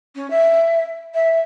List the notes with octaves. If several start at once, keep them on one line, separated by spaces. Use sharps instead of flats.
C#4
E5
E5